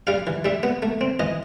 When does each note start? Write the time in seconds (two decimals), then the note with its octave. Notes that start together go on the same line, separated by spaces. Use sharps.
0.07 G3 F5
0.27 E3
0.45 G3 E5
0.63 B3
0.82 A3
1.01 C4
1.20 E3 D#5